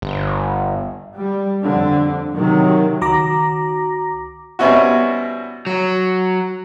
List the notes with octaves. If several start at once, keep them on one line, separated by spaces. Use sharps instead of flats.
G1
G3
F2 D3
C3 D#3 F#3
C#2 D#3 F#4 A#5 D6 A#6
B2 G3 C4 C#4 E4 F#4
F#3